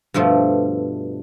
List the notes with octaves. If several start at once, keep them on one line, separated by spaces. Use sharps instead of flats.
G2 B2 F3 A3